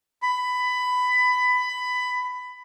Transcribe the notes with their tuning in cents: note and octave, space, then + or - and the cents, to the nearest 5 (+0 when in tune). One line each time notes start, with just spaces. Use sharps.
B5 +15